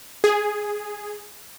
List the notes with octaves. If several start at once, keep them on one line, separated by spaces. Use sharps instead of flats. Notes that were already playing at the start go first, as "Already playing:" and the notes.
G#4